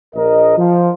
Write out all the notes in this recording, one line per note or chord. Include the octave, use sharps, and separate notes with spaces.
A#1 A#4 D#5
F3